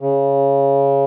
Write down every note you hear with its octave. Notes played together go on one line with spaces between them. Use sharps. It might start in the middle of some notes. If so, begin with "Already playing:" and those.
C#3